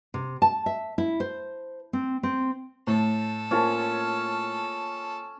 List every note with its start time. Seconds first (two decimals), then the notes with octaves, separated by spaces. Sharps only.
0.14 C3
0.42 A5
0.66 E5
0.98 E4
1.20 C5
1.93 C4
2.23 C4
2.87 A2 A4
3.51 A#3 C#4 F4 A5